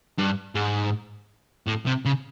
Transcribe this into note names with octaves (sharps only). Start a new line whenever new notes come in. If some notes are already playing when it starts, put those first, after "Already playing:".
G2
G#2
A2
C3
C#3